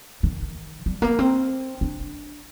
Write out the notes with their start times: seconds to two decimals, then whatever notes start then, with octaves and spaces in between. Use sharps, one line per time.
0.23 D#3
0.86 G3
1.02 A#3
1.19 C4
1.81 D4